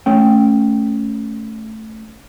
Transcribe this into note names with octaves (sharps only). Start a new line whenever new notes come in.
A3 C#4 G5